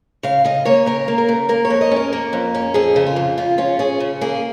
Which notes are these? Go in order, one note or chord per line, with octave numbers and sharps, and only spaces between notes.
C#3 F5
C#3 D#5
A#3 C#5
C#3 A#4
A#3
A#4
C#3
A#3 A#4
C#5
F2
D#5
C#4 A#4
A#3
F2
C#4
F2 G#4
C#3
F4
F2
C#3 F4
C#4 F4
C#4 G#4
C#3
A#3 G#4